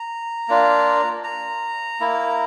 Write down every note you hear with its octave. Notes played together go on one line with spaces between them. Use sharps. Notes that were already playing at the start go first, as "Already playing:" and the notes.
Already playing: A#5
A#3 D4 F4
A#5
A#3 E4